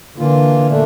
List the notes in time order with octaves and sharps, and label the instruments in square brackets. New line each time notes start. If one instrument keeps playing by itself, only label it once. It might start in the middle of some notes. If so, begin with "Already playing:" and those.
[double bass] D3 [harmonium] E3 A#3 F4
[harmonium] A#2 A3 D4